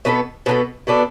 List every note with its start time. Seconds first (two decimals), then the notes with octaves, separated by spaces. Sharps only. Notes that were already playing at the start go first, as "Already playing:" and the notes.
0.05 B2 B3 D4 A4
0.46 B2 B3 D4 A4
0.87 B2 B3 D4 A4